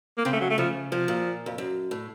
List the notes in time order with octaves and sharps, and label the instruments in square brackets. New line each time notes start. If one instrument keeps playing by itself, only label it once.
[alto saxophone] A#3
[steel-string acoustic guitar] C#3 [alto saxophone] C4
[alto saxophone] A3
F#3
A3
[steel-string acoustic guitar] C#3 [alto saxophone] F3
[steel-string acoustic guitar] C3 [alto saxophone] F3
[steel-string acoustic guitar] A#2
F2
F#2
A2